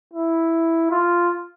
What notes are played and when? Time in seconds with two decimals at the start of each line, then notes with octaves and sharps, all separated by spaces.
0.14 E4
0.91 F4